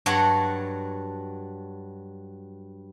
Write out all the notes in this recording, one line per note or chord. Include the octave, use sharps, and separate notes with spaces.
G2 F#3 A4 C#5 F#5